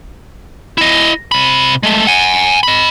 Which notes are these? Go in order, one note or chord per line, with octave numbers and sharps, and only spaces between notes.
E4 D#5
C3 B5
G#3 A3
F#5 G#5
D#5 B5